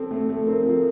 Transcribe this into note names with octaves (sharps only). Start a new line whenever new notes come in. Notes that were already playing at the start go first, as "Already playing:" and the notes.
Already playing: C4 A4
A3
A3 A4
C4 A#4
F3